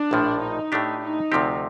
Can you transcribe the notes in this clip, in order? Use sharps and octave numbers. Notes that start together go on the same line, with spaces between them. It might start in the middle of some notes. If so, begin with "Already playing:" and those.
Already playing: D4
A#1 A2 F3
D#4
A2 A3 D4 G4
D#4
D2 C3 F3 C4 G4